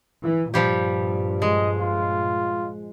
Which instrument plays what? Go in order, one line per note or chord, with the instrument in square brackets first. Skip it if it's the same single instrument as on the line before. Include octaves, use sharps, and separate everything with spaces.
[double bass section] E3
[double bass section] G2 A#2 [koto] F3 G3 G4
[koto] G#3 [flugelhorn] D#5
[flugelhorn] F4